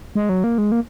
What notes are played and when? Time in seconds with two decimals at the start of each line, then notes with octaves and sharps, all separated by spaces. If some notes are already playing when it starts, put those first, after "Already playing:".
0.15 G#3
0.29 F#3
0.44 A#3
0.58 G#3
0.72 A#3